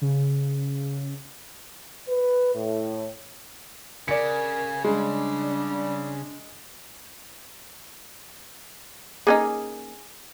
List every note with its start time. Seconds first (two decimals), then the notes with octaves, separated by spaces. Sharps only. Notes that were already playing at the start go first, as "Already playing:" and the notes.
0.01 C#3
2.08 B4
2.55 A2
4.08 C#3 A#4 D5 G#5 C#7
4.84 G3 G#3 D4
9.27 A#3 C#4 D#4 G#4